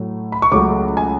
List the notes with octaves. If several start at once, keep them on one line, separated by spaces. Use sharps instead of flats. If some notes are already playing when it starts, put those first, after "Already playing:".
Already playing: A2 F#3 A3
B5
C#6
C#2 C#3 F#3 A3 D6
G#5